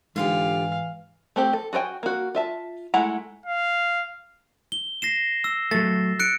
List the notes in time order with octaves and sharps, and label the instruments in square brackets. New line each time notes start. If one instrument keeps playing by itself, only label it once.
[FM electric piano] G#2 [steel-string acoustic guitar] D3 F4 G4 [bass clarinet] E3 [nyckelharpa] F5
[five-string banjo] A3 C4 G4
A4
F#4 G#4 A#4 G5 G#5
A#3 F#4
F4 E5 A5
G#3 A3 E4 F#5 A#5
[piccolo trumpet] F5
[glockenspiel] G7
A#6 C7 E7
E6
[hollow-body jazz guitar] F#3 A3 [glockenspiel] A6
[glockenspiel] F#6 C#7 D7